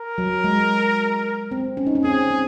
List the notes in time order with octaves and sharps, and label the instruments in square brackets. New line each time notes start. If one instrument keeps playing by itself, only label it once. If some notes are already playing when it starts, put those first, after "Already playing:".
Already playing: [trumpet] A#4
[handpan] F#3
G#3
C4
C#4
D#4
C#4
[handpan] C4 [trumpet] G#4
[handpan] C4